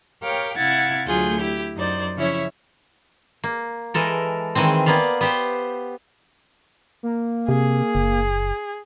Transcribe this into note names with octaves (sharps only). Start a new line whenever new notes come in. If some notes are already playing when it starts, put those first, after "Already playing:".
G4 A#4 C#5 F5 G5
C3 E4 F5 F#5 G#6 A6
D2 F#3 A3 F4 G#4 G6
E4 G4
F#2 D#4 C5 D5
C#3 F3 C#4 E4 C#5 E5
A#3
E3 G#3 A4 A#4
D#3 E3 G#3 C4
A#3 B3 D5 F5
B3 G4 C5
A#3
C3 G#4
F#1